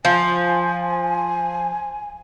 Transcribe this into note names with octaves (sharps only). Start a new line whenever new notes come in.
F3 G#5